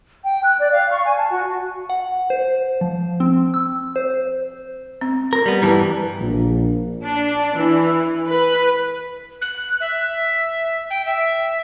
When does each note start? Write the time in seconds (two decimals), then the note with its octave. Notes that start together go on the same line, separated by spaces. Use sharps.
0.23 G5
0.43 F#6
0.58 D5
0.71 F5
0.91 C#6
1.05 G#5
1.17 A5
1.30 F#4
1.90 F#5
2.30 C5
2.81 F3
3.20 C4
3.54 E6
3.96 C5
5.01 C4
5.33 A#4
5.46 G3 B3
5.62 G2 E3 G3 B4 A5 A#5
6.19 A#1
7.03 D4
7.58 E3
8.27 B4
9.41 F#6
9.81 E5
10.90 G5
11.05 E5